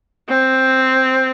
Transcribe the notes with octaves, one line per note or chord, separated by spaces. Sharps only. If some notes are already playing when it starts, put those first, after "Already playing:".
C4